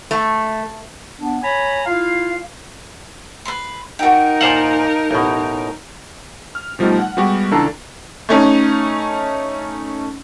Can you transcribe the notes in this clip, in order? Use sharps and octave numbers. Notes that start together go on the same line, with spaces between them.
A3
B3 D4
C#5 G#5 A#5 B5
E4 F4 F5
B4 C6
D#4 F#4 A#4 G5
A#2 C5 F5 F#5 A5
A1 B2
F6
B2 F3 G3 A3 D#4
F#5
G3 G#3 B3 F#4 G4
C#2 E3 D4 A4 A5 A#5
A3 C#4 D#4